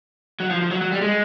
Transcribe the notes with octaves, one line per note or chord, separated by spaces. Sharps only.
F#3
F3
F3
F#3
F#3
G3
G#3